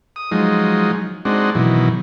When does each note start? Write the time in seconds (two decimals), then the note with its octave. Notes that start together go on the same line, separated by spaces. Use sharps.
0.16 D#6
0.31 F3 F#3 G#3 D#4
1.25 G#3 C4 D4 D#4 F#4
1.55 B2 D#3 E3 F#3